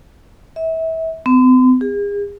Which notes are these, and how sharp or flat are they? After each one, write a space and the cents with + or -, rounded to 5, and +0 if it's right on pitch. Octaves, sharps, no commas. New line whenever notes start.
E5 -30
C4 -45
G#4 -40